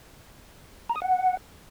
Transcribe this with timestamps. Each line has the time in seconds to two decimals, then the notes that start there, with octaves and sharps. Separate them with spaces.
0.89 A#5
0.96 D#6
1.02 F#5